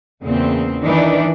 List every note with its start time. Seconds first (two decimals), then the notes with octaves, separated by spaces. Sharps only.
0.24 E2 A#2 C#3 C4
0.84 D#3 E3 D4 D#4 D5